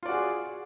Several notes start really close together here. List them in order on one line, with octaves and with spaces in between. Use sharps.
F4 D5 F#4 G#4